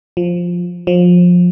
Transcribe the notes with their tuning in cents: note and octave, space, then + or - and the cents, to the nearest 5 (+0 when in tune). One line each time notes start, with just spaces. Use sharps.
F3 +5
F3 +25